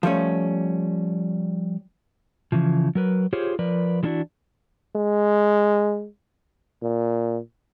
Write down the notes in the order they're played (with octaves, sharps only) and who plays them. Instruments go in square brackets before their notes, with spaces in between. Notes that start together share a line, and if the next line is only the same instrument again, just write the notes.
[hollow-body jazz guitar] F3 G3 A3 C#4
[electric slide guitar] C#3 E3 F3
F#3 A#4 B4
F4 G4 G#4 C5 C#5
F3 A#4 B4 D5
E3 G#3 A#3 D4 E4 F#4
[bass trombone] G#3
A#2